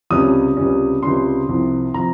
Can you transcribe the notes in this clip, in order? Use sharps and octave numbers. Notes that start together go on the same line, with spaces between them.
C#2 C3 G3 C#4 D#6
C#2 C3 G3 C#4
C#2 C3 G3 C#4 C6
C2 C3 F3
C3 F3 A#5